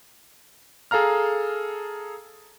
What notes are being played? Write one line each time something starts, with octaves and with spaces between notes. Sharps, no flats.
G#4 A4 F5 A#5 F6